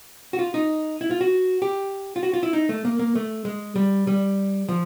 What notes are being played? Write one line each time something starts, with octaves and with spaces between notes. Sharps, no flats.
F#4
F4
D#4
E4
F4
F#4
G4
F4
F#4
F4
E4
D#4
A3
A#3
A#3
A3
G#3
G3
G3
F3